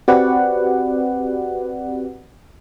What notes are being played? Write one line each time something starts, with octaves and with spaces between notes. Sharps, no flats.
C4 F#4 G4 B4 D5 F#5